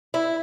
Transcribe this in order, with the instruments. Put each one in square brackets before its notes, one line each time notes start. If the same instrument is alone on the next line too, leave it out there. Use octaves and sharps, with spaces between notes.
[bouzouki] E4